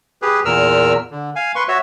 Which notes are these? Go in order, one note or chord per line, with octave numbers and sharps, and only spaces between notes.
G4 G#4 B4
E2 A#2 A#4 E6 F6
D3
F5 G#5
B4 C6 C#6
F#4 C#5 E5